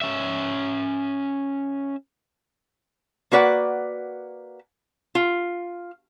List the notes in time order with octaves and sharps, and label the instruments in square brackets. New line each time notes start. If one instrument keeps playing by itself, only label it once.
[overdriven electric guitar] C#4 E5
[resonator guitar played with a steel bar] A#3 F#4 B4 D5 F#5
F4